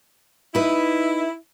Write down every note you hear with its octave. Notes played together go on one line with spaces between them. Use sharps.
D#4 E4 B4